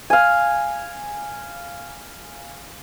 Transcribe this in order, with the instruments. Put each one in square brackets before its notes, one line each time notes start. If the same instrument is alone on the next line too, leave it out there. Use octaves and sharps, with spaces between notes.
[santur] F5 G#5